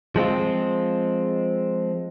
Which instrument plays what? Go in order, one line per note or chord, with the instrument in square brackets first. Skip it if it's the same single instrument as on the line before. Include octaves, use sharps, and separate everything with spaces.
[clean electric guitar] F3 G#3 C4 F4